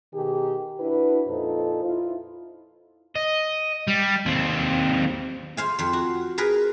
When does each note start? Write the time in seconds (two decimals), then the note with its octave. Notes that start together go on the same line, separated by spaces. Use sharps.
0.14 B2 D#3 G4 G#4
0.80 D4 E4 F#4 B4
1.28 F2 A#2 D#4 F4 A4 C5
1.85 E4 F4
3.15 D#5
3.88 G3
4.26 D#2 C4
5.57 C5 F5 G#5
5.79 F2 C5
5.93 F#4
6.38 G#4 A#4 B4